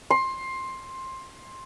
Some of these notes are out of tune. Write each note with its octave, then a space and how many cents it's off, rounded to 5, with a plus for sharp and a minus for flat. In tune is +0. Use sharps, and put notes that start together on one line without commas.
C6 +15